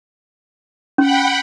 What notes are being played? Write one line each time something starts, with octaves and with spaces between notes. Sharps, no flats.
C#4 F#5 G5 B5